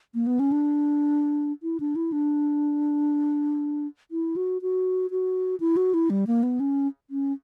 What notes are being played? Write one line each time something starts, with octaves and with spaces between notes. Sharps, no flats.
A#3
B3
C#4
D4
E4
D4
E4
D4
E4
F#4
F#4
F#4
E4
F#4
E4
G3
A#3
B3
C#4
C#4